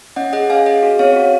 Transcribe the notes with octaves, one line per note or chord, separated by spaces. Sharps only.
C#4 D#5 F#5
G#4 D#5 F#5
C#4 F5 G#5
G#4 D#5 F#5
F#4
C4 C#5 F5
F#4